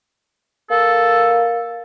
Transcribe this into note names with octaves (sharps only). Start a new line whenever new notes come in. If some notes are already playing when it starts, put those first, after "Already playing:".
A#3 A4